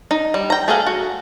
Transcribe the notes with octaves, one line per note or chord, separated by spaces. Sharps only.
D#4
G3
G5 A#5
A3 G#4 A4 F5 F#5
F#4